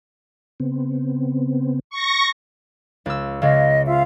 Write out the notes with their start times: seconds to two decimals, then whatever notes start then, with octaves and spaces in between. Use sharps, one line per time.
0.60 C#3 B3 C4
1.90 C#6 A#6
3.06 C#2 E6
3.42 C#2 C#3 D#5 F5
3.86 F4 E5 F5